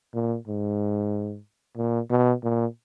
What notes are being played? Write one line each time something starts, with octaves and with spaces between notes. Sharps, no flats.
A#2
G#2
A#2
B2
A#2